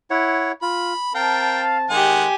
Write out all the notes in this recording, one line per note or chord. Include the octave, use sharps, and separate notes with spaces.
E4 C#5 F#5
F4 B5
C4 A#4 F5 G5 A5
D#3 G#3 G4 F#5 G#5